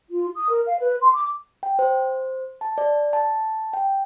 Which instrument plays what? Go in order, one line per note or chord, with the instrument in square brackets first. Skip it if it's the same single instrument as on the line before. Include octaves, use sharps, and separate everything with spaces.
[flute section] F4
D#6
A#4
F5
B4
C6
D6
[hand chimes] G5
C5
A5
D5
A5
G5